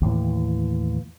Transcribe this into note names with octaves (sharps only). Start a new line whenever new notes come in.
D#2 A2 E3